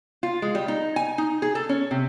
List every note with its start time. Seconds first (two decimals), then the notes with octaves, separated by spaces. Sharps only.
0.23 F4
0.42 G#3
0.55 G3
0.68 D#4
0.96 G#5
1.18 D#4
1.42 G#4
1.55 A4
1.69 C#4
1.91 C3